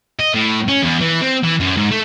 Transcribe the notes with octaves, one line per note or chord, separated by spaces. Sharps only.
D#5
A2
C#4
E2
E3
C4
E3
F#2
G#2
A3